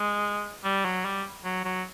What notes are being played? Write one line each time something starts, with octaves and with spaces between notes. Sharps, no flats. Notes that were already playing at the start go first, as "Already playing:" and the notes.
Already playing: G#3
G3
F#3
G3
F#3
F#3